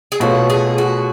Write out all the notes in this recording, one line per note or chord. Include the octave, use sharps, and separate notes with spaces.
G#4
B2 A3 F4 F#4 A4 C#5
G#4
F#4